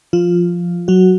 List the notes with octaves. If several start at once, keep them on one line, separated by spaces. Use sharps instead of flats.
F3 F4
F#3 F#4